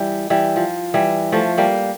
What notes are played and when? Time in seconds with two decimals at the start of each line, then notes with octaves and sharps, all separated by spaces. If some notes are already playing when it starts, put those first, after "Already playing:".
Already playing: E3 G3
0.30 E3 G3
0.56 F3
0.94 E3 G3
1.32 F3 A3
1.58 G3 A#3